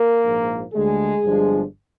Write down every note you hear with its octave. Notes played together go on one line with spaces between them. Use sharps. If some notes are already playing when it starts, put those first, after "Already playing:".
Already playing: A#3 A#4
A#1 G#2 F3
D2 D3 G3 G#3 G#4
G1 G2 F3 G#3 D4